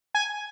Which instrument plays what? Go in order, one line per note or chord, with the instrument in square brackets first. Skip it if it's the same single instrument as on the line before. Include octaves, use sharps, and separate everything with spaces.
[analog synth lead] G#5